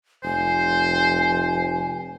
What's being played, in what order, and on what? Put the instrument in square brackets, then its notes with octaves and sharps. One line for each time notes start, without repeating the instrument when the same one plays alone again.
[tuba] F1 [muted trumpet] C5 [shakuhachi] G#5